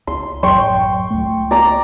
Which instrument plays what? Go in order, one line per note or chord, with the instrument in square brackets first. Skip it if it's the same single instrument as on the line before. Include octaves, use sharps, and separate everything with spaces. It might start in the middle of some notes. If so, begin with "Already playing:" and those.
[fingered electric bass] C#2 [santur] C6
[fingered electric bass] A1 F#2 F#3 [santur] G5 C6 C#6
[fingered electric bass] C#2 A3
[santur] D5 A#5 D6